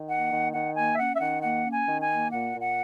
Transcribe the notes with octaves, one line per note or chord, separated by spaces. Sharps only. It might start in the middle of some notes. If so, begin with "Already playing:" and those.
Already playing: D#3
A#3 F#5
D#3
D#3 F#5
A#3 G#5
E5
C#4 F#5
E5
D#3 F#5
A#3 F#5
C#4
G#5
D#3
G#5
A#3
A#2 F#5
A#2
F#5